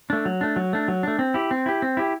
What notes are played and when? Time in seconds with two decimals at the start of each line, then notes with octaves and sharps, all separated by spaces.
0.10 A3 D4
0.25 F#3
0.41 A3 D4
0.56 F#3
0.73 A3 D4
0.88 F#3
1.03 A3 D4
1.19 C4
1.34 E4 G4
1.51 C4
1.66 E4 G4
1.82 C4
1.97 E4 G4